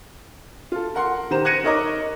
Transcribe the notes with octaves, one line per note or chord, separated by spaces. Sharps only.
F4 A4
A#4 F#5 C6
D#3 G4 C5 A#5 E7
F#6 G#6 A#6 C#7 D#7 E7
D#4 A#4 C#5 D#5 A#5 D6